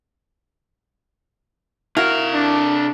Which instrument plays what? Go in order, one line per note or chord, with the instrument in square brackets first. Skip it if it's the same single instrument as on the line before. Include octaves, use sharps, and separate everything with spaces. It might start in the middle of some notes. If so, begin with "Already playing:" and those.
[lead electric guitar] C3 F5 [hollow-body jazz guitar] E4 F#4 [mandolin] A#4
[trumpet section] D4